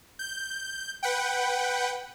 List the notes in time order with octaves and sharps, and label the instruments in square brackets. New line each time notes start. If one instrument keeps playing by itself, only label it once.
[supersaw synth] G6
B4 F#5 G5